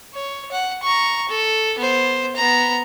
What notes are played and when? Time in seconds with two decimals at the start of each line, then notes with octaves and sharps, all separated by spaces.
0.14 C#5
0.52 F#5
0.83 A#5 C#6
1.29 A4
1.78 B3 C5
2.36 B3 A#5